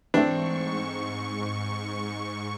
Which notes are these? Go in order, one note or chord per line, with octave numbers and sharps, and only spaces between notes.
G#2 E3 A3 C4 D4 C#6